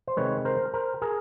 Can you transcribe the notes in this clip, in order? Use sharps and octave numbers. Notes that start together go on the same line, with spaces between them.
C5
C3 D#3 G#3 B4 C#5
A#4 C5
A#4 C5
G#4 A#4